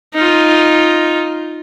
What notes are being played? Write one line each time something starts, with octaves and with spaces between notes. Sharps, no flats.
D#4 F4